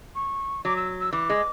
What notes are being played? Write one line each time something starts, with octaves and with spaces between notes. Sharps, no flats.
C#6
F#3 D6
E6
E6
E3 D6
G#3